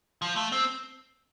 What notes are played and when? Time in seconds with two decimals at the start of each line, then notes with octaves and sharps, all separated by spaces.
0.22 F3
0.36 A3
0.52 C4